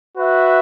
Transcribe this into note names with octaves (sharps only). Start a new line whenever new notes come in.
F#4 B4 E5